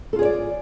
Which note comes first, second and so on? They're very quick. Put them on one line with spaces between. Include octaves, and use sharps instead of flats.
A4 F4 G#4 C#5 D5